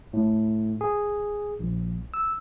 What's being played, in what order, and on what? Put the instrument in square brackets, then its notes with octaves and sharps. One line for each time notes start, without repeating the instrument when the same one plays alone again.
[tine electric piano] A2
G#4
A#1
E6